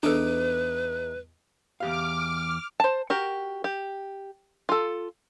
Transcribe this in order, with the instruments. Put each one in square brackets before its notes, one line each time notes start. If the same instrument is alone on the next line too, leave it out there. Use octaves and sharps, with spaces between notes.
[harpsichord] E2 D#4 D6 [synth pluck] D4 A4 [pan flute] B4
[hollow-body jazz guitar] E2 G4 F5 [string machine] D6 F6
[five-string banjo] C5 A5
F#4 G4 A#4
G4
F4 A4